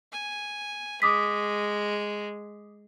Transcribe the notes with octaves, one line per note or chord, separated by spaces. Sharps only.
G#5
G#3 D6 D#6 B6